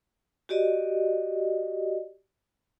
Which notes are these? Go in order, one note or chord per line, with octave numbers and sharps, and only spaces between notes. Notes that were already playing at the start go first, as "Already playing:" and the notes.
F#4 G4 D5 D#5